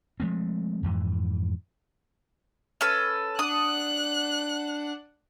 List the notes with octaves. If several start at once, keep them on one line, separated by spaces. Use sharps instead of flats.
F3 G#3 A3 C4
F2 G#2 E3
C#4 A4 B4
D4 F#5 D#6 F#6